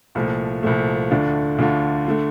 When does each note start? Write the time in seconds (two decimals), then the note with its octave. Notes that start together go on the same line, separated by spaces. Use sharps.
0.15 C2 A#2 F3 A3
0.63 C2 A#2 F3 A3
1.10 D2 D3 A3 D4 F4
1.59 D2 D3 A3 D4 F4
2.08 D3 A3